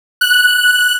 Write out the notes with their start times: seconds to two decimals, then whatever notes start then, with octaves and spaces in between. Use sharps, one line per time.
0.21 F#6